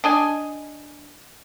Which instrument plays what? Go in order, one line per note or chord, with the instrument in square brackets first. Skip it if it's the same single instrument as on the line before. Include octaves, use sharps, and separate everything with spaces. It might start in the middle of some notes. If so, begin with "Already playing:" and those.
[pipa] D4 D#5 G#5